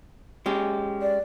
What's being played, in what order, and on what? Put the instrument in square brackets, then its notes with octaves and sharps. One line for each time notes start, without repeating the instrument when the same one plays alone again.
[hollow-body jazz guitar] G#3 C#4 G4
[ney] D5